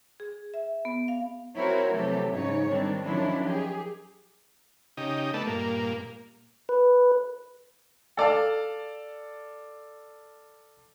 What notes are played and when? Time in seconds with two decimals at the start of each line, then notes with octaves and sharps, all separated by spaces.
0.20 G#4
0.54 E5
0.85 B3
1.08 F5
1.57 C4 E4 F#4 A#4 C5 C#5
1.93 C3 E3 F#3 A3 G4 A4
2.32 G#2 C#3 D#4 C#5
2.69 D#3 G3 C4 D4
3.05 D#3 F3 F#3 C#4 D4 E4
3.45 G4 G#4
4.97 C#3 D#4 G4
5.34 A3 B3 D4 A4
5.47 G2 A#2 A#3
6.69 B4
8.17 A4 D5 F5 A5